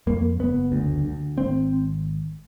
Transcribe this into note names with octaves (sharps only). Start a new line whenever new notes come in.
F2 A#3
F#1 B3
D2
D2
G#1 C4